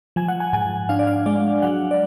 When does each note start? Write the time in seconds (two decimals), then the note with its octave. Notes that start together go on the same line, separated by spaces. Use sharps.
0.16 F3 G#5
0.28 F#5
0.40 G#5
0.53 G#2 G#5
0.89 D4 F5
0.99 D5
1.07 F5
1.26 G#3 D5
1.62 F#3 F#5
1.91 D5